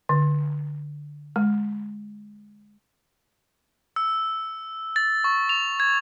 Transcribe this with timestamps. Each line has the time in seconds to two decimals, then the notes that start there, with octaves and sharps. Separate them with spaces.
0.09 D3
1.36 G#3
3.96 E6
4.96 A6
5.24 C#6
5.49 F7
5.80 G#6